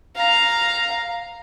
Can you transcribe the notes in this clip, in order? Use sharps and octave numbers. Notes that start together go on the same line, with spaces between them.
F5 A#5